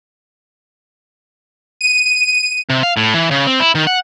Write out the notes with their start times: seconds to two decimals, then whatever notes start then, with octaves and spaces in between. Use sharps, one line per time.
1.81 D#7
2.70 C3
2.83 F5
2.97 A2
3.14 E3
3.31 C#3
3.47 C4
3.60 E4
3.75 D#3
3.87 F#5